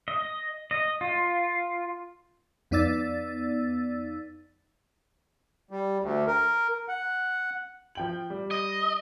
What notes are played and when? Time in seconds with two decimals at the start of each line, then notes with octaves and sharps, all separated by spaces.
0.08 D#5
0.71 D#5
1.01 F4
2.71 F2 B3 D#4 D5 E6 A6
5.71 G3
6.01 D2
6.27 A#4
6.88 F#5
7.95 F3 G5 F#7
8.30 G3
8.51 D#5